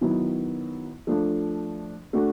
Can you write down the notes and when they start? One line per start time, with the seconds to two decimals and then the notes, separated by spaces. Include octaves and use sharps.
0.01 D#3 F#3 B3 E4
1.07 F3 A3 D4
2.13 A3 D4 F#4